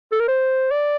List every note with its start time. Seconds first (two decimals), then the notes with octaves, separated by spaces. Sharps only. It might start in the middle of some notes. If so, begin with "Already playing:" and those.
0.12 A4
0.20 A#4
0.28 C5
0.71 D5